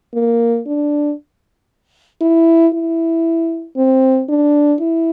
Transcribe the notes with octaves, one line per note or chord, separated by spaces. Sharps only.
A#3
D4
E4
E4
C4
D4
E4